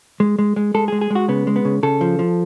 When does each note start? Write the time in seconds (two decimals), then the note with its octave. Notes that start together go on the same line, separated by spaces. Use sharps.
0.20 G#3
0.39 G#3
0.56 G#3
0.74 G#3 A4
0.88 G#3 G#4
1.01 G#4
1.10 G#3 F#4
1.28 C#3 B3
1.47 G#3
1.56 B3
1.65 C#3
1.83 C#3 A4
2.01 F3
2.19 F3